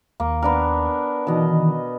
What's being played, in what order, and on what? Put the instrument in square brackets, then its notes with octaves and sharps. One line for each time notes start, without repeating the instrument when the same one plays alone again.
[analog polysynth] D#2 [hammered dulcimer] A#3
[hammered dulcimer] B3 D4 A#4
[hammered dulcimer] B2 D#5 [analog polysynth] D#3 E3